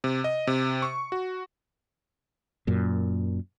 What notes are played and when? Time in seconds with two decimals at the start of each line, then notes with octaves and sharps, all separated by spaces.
0.04 C3
0.24 D#5
0.47 C3
0.82 C#6
1.12 F#4
2.67 F#2 A#2